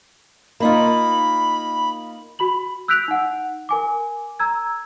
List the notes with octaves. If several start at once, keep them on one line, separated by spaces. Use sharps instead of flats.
A#3 D#4 F4 B5
F#4 B5 F#7
E6 F#6 G6 B6 D7 F7
D#4 F#5
A#4 G#5 D6
A#5 E6 G#6